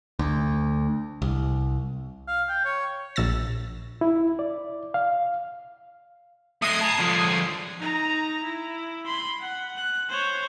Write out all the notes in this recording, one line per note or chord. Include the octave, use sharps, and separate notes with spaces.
D2
C2
F5
G5
C#5
A#1 E6 A6 A#6
E4
D5
F5
A3 D#5 D#6 G#6 C7
A5 A#5
D3 F3
D#4 A#5
E4
B5 C6
F#5
F#6
C5 C#5